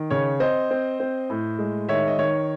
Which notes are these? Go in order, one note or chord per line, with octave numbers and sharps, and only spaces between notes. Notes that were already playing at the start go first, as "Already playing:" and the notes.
Already playing: D#3
C#3 C#5
C4 C5 D#5
C4
C4
A2
G#3
D#3 C#5 E5
D#5
D#3 C#5